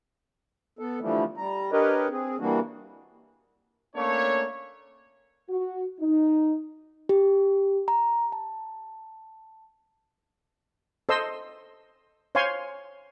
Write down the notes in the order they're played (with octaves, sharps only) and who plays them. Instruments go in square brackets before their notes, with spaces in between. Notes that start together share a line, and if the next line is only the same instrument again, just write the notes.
[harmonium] B3 A4
D3 E3 F3 G3 A3
G3 A#5
D4 G4 A#4 B4 C#5 D#5
C4 G#4
E3 G3 A#3 D4 F#4
[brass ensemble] A3 A#3 C#4 D4 C#5
[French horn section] F#4
D#4
[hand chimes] G4
A#5
A5
[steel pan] A4 C5 D#5 C6 E6
C5 C#5 F5 G#5 C6